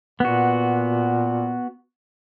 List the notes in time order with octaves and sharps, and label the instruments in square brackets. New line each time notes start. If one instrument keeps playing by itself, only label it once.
[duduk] A#2 [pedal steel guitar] B3 F#4